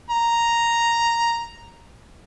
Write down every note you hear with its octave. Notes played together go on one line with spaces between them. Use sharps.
A#5